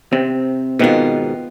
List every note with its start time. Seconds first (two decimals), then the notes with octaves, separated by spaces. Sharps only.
0.13 C3 C4
0.79 G#2 B2 D#3 B3 F4